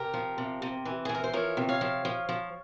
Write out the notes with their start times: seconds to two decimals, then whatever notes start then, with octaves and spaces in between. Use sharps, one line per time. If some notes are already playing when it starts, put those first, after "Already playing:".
Already playing: C3 G4 A#4
0.14 F3
0.38 C3
0.62 C3
0.85 E3
1.05 G#4
1.09 E3
1.15 A#4
1.24 C5
1.33 F3 A#4 C#5
1.57 C3
1.69 C#5 F5
1.81 F3
2.05 F3
2.29 F3